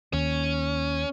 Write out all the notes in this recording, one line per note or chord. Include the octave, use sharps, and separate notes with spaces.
D#2 C#4